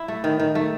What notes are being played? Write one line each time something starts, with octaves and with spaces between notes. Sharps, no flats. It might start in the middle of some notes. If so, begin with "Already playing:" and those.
Already playing: E4
A3
D#3
D#3
A3